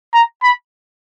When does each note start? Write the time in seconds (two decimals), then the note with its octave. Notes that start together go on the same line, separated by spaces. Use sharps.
0.14 A#5
0.43 B5